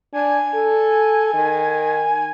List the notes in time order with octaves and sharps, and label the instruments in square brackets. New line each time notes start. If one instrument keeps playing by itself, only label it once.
[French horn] D4 [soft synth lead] G#5
[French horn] A4
D#3